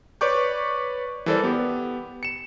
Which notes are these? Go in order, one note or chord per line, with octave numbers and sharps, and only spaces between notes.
B4 C#5 D5 C#6 D6 G6
E3 G3 A4 A#4 C5 D5
B3 G4
C#7 E7